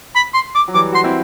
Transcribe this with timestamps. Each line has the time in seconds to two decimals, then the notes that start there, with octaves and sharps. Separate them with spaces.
0.15 B5
0.34 C6
0.55 D6
0.68 F#3
0.74 E3 G3 D6
0.92 F#4 C6
1.04 C4 E4